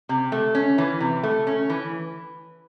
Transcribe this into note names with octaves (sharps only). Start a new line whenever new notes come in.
C3
A3
C#4
E3
C3
A3
C#4
E3